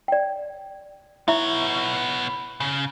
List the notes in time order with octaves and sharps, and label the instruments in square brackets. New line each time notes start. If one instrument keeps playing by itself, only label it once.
[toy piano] D5 G5
[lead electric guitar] B3 C#5 [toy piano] E4 E5
[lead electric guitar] C#3